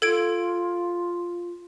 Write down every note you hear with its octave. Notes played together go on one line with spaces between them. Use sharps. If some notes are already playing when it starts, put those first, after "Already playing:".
F4 A4 G#6 D7